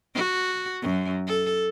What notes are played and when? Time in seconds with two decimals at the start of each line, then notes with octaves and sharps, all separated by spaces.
0.15 F#4
0.82 F#2
1.27 A4